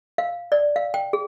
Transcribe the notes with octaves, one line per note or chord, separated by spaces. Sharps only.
F5
D5
F5
G5
G#4